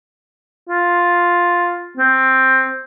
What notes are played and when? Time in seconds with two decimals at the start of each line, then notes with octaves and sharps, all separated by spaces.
0.69 F4
1.97 C4